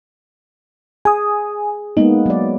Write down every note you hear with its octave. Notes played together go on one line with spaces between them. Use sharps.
G#4 G#5 D#6
G#3 A#3 B3 D#4
F#3 D5